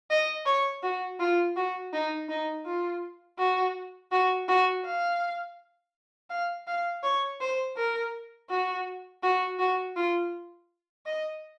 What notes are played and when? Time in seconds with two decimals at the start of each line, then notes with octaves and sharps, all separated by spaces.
0.10 D#5
0.46 C#5
0.83 F#4
1.20 F4
1.56 F#4
1.93 D#4
2.29 D#4
2.65 F4
3.38 F#4
4.12 F#4
4.48 F#4
4.85 F5
6.30 F5
6.67 F5
7.03 C#5
7.41 C5
7.76 A#4
8.50 F#4
9.23 F#4
9.59 F#4
9.96 F4
11.06 D#5